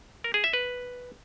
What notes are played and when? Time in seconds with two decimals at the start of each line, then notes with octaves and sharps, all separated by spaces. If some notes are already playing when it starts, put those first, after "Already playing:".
0.24 A#4
0.34 G#4
0.44 E5
0.53 B4